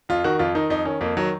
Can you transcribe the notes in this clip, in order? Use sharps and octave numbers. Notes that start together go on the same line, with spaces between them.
F2 F4
D#3 F#4
F2 F4
D#3 D#4
F2 D#4
D#3 C#4
F2 A#3
D#3 F#3